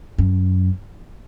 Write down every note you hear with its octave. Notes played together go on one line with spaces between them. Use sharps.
F#2